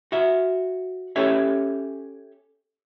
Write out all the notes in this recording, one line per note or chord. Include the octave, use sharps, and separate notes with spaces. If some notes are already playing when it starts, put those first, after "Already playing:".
F#4 E5
C#4 G4 A4 C#5 E5